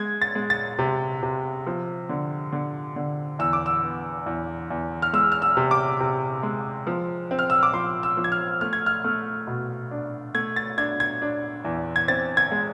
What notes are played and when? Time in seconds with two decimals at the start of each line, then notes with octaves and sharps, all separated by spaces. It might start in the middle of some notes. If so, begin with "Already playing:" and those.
Already playing: G#3 G#6
0.22 A6
0.35 G#3
0.50 A6
0.79 C3
1.23 C3
1.67 F3
2.09 D3
2.52 D3
2.96 D3
3.39 E2 E6
3.53 D6
3.66 E6
3.83 B3
4.26 E2
4.70 E2
5.02 F6
5.13 G#3 E6
5.32 F6
5.42 E6
5.57 C3
5.71 D6
6.00 C3
6.43 G#3
6.87 F3
7.31 C4
7.39 F6
7.50 E6
7.63 D6
7.73 F3 C6
8.03 E6
8.17 F3
8.24 G#6
8.32 F6
8.61 A3 F6
8.73 G#6
8.86 F6
9.04 A3
9.47 B2
9.91 D4
10.34 A3 G#6
10.56 A6
10.78 D4 G#6
11.00 G#6
11.22 D4
11.65 E2
11.96 G#6
12.08 C4 A6
12.37 G#6
12.51 G#3